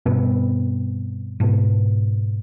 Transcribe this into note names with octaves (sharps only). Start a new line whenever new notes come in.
G2 B2 B3 C4
G#2 B2